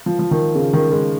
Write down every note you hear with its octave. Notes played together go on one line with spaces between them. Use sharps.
F3
F3
D#3
C#3
D#3
G#3